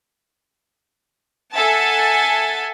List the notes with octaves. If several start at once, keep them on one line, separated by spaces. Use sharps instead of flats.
A4 E5 F#5 G#5 A5 A6